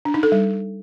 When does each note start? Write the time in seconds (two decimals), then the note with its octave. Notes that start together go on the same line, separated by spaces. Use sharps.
0.05 D4
0.14 D#4
0.23 A4
0.32 G3